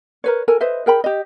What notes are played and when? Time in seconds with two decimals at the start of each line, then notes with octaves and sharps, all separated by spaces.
0.24 A#4 B4 C#5
0.48 A4 A#4 G#5
0.60 B4 C5 D#5 E5
0.86 G#4 A#4 G5 B5
1.04 G4 D#5